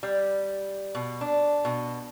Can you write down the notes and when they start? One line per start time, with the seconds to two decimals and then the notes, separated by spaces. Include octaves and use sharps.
0.03 G3
0.95 B2
1.21 D4
1.65 B2